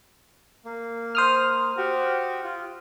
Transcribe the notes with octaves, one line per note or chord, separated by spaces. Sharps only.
A#3
C5 D#6 F6
F#4 G4
F4